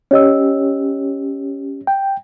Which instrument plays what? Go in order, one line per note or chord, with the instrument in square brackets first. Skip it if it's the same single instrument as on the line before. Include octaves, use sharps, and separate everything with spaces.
[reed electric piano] C#4 G4 [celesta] C#5 D#5 E6
[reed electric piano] G5